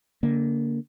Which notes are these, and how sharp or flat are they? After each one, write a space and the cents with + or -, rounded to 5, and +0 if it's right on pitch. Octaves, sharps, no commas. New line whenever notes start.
D3 -35 A#3 +0